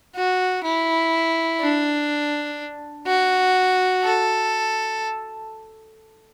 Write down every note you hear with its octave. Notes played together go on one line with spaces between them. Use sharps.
F#4
E4
D4
F#4
A4